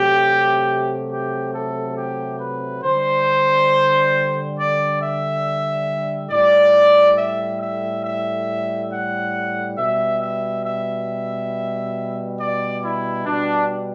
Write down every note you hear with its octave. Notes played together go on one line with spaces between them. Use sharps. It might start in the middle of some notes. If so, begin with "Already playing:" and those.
Already playing: C3 F#3 A3 G4
G4
A4
G4
B4
D3 G3 C5
D5
E5
A2 G3 D5
E5
E5
E5
F#5
B2 G3 E5
E5
E5
D5
E4
B2 G3 D4